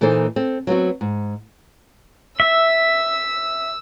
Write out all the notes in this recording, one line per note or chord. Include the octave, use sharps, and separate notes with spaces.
A#2 E3 A#3 D#4 A4 C5
C4 A4
F#3 B3 C4 F#4
G#2
E5 E6